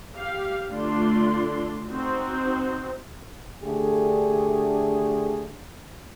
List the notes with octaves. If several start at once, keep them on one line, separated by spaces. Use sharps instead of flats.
G4 F5
D3 A3 D4 F4 D5 C6
C4 D#4 F#4 C5
D3 A3 D4 G4 G#4